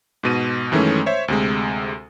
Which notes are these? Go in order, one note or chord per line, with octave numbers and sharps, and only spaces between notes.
G#2 B2 D#7
F#2 D#3 E3 G#3 A3 C#4
C5 C#5 E5
D2 C3 G#3